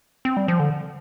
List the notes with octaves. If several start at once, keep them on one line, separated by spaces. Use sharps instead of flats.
C4
G3
F3
D3